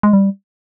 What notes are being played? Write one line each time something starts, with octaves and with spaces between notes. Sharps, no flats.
G#3
G3